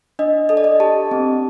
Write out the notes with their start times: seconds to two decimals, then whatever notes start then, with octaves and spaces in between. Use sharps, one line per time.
0.19 D4 D#5
0.49 A4 D#5
0.57 D5
0.64 D#5
0.80 G4 A5
1.11 C4